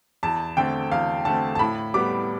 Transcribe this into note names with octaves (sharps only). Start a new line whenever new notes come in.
E2 A5
D3 A3 C4 G5
E2 F5
D3 A3 C4 A5
A5
A2 B5
G3 B3 D6